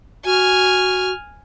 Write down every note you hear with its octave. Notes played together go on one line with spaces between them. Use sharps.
F#4 G#5 F6